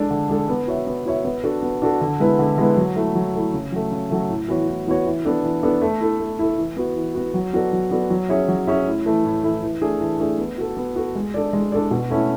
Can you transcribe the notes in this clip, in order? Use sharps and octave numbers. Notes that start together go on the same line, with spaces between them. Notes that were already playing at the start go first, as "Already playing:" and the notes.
Already playing: G#3 D4 A4
D3
G#3 D4 A4
B3
F#4 C#5 E5
B3
F#4 C#5 E5
B3
D4 F#4 A4
B3
D4 F#4 A4
D3
G#3 B3 E4 B4
D3
G#3 B3 E4 B4
F#3
A3 E4
F#3
A3 E4
C#3
F#3 A3
C#3
F#3 A3
A2
E3 B3 F#4 C#5
A2
E3 B3 F#4 C#5
E3
B3 D4 A4
E3
B3 D4 A4
A3
E4 A4
A3
E4 A4
E3
B3 F#4
E3
B3 F#4
F#3
B3 F#4 A4 D5
F#3
B3 F#4 A4 D5
F#3
C#4 G#4 C#5 E5
F#3
C#4 G#4 C#5 E5
A2
E3 A3 E4
A2
E3 A3 E4
E3
A3 D4 G#4
E3
A3 D4 G#4
B3
F#4 A4
B3
F#4 A4
G#3
D4 A4 D5
G#3
D4 A4 D5
B2
A3 C#4 E4